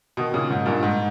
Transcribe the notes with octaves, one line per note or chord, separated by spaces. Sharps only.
B2 D#3
A#2 C#3
G#2
G2 A#2
G#2